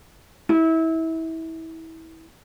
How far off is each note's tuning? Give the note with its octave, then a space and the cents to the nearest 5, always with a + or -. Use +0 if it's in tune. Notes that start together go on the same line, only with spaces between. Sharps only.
E4 -25